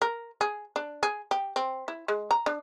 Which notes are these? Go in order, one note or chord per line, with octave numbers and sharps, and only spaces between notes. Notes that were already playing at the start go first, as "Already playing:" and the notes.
A#4
G#4
D4
G#4
G4
C4
E4
G#3
A#5
D4